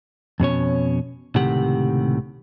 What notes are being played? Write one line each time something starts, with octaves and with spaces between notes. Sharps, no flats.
F2 B2 C#4 C#5
C#2 A2 C3 D#3 G4 F#5